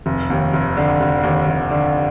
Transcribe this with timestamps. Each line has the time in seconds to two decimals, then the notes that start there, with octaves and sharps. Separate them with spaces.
0.06 F1
0.30 D#2
0.53 F1
0.77 D3
1.00 F1
1.23 D#2
1.48 F1
1.71 D3